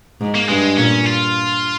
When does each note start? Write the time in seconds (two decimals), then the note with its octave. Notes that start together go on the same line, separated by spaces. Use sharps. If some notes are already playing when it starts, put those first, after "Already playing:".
0.21 G#2
0.35 A#3
0.49 G2 G#3
0.78 A#2 C#4
1.06 F4